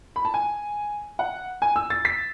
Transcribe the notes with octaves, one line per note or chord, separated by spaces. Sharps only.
B5
A5
G#5
F#5
G#5
E6
A6
B6